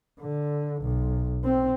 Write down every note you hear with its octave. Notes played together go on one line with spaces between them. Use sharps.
D3
B1
C4